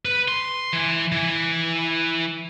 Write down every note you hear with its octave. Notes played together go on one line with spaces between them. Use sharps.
B4
C6
E3
E3